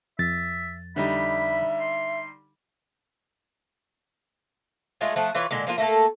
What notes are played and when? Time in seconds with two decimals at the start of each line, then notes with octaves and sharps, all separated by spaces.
0.19 F2 E5 A6
0.96 D3 G3 D#4 E5 B5
1.80 C6
5.01 G#3 A3 F4 G#4
5.16 F3 A3 F#5
5.35 E3 F4 B4 C#5
5.51 A#2 D3 G#3
5.67 F3 A#3 F4
5.78 A3 A#3 A4